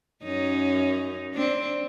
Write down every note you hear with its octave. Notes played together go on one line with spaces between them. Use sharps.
F#2 C#4 D#4
C4 D4